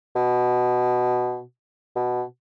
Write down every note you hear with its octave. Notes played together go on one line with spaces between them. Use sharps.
B2
B2